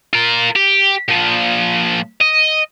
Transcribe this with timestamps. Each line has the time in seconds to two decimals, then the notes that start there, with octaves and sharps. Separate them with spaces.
0.13 F4 A#4
0.56 G4
1.09 A#2 F3
2.21 D#5